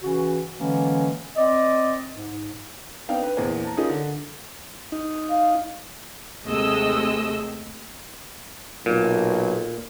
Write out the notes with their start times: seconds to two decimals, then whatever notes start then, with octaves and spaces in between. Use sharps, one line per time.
0.03 C#3 E3 C#4 F#4
0.59 D3 E3 G#3 A#3 C#4
1.36 C4 D5 D#5
2.13 G#2
3.08 B3 C4 D4 D#4 F5 G5
3.23 B4
3.37 A#1 E2 A#3 C5 G#5
3.64 A5 A#5
3.77 C#4 D#4 F4 G#4 A#4 D#5
3.89 D3
4.92 D#4
5.30 F5
6.44 D#2 C3 G#3 A3 D#5 E6
8.86 B1 A#2